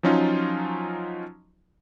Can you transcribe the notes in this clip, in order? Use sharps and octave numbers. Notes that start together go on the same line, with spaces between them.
F3 F#3 C#4 D#4 F4